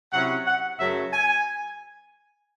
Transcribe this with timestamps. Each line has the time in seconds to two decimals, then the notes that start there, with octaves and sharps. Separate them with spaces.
0.12 C3 F#3 C#4 E4 F#5
0.46 F#5
0.79 F#2 C#3 F#3 A3 E5
1.13 G#5